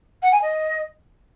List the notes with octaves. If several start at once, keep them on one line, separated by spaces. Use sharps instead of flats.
F#5
G#5
D#5